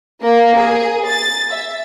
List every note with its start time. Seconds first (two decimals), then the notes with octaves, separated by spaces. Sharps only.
0.24 A#3
0.57 G#4
1.08 A6
1.51 E5